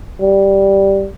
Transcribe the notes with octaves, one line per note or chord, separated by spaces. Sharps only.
G3